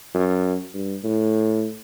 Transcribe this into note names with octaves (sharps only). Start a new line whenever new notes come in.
F#2
G2
A2